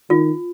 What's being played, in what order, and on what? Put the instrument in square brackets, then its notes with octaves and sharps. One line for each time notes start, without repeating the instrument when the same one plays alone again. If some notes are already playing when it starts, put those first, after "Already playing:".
[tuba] D#3 [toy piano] F4